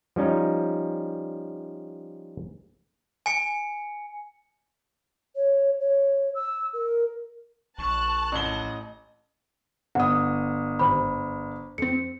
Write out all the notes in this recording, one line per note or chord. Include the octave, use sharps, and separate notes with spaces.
F3 G3 C#4 D#4
G#5 C#7
C#5
C#5
E6
A#4
A#1 A5 C#6 F#6
A1 D#5 G7
G1 F#5 D#6
G#1 G4 C5 B5
F2 C4 C#7